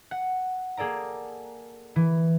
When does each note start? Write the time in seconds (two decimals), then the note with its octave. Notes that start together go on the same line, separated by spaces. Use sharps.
0.11 F#5
0.77 A#3 G#4 A4 D5 A#5
1.96 E3